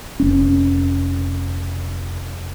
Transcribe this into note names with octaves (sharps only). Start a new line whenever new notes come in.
F1 C#4